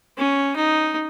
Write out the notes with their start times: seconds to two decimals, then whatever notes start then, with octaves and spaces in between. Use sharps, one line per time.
0.18 C#4
0.56 D#4